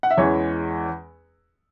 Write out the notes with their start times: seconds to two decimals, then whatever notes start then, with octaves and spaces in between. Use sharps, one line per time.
0.03 F#5
0.11 E5
0.17 E2 E3 G#3 C#4 C#5